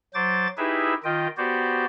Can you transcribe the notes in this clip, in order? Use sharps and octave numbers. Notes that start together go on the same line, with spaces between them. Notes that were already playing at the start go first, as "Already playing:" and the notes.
F#3 C5 D6 A6
D#4 E4 G4 G#4 B4 E5
D#3 F4 D#5 G5
B3 F#4 G4 C5 D5